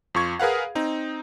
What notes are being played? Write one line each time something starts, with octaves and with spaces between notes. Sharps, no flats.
F2 F4 C#6 G#6
G#4 A#4 B4 F5 F#5
C4 D#4